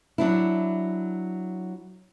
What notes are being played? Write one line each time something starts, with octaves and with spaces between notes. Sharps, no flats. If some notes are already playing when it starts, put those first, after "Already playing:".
F#3 D4 E4